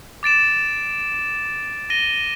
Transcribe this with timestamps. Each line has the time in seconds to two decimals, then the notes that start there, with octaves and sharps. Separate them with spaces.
0.23 D6 A6 D7 E7
1.90 A#6 D#7 G7